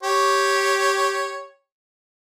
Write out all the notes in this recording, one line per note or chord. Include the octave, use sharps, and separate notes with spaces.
G4 C#5